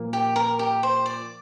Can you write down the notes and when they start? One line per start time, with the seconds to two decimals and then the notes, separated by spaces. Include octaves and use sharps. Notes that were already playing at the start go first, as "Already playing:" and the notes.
Already playing: A#2 F3 A#3
0.13 G4
0.36 A#4
0.59 G4
0.83 C5
1.06 D5